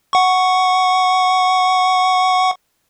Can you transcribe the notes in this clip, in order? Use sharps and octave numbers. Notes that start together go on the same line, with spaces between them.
F#5 C#6